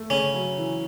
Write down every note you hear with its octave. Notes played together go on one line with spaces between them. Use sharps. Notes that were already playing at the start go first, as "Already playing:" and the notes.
Already playing: A3
C#3 C#4
F#3
E3